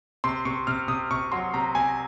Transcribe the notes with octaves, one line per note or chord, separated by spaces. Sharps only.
C3 C6
C3 C#6
C3 F6
C3 D#6
C3 C#6
F#3 C6
C3 A#5
C3 G#5